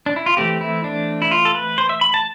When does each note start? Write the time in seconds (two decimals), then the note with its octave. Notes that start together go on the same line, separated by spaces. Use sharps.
0.06 D4
0.16 E4
0.26 F4
0.37 E3 A3 C4 G4
0.61 E4
0.84 D4
1.22 E4
1.31 F4
1.45 A4
1.55 B4
1.78 C5
1.89 E5
2.01 B5
2.14 A5